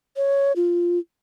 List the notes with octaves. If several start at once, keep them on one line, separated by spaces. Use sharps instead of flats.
C#5
F4